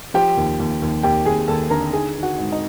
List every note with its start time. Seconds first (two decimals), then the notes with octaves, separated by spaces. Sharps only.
0.14 F3 G4 G5
0.37 D#2
0.60 D#2
0.82 D#2
1.03 D#2 G4 G5
1.25 D#2 G#4 G#5
1.48 D#2 A4 A5
1.70 D3 A#4 A#5
1.93 D#3 G#4 G#5
2.15 D#3
2.23 F#4 F#5
2.38 G#2
2.52 D#4 D#5